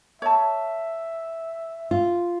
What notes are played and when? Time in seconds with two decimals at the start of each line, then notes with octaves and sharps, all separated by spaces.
0.22 C#5 E5 A5
1.91 F4